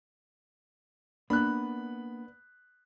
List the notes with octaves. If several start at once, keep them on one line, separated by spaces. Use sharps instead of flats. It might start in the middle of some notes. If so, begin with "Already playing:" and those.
A#3 B3 D4 B5 F#6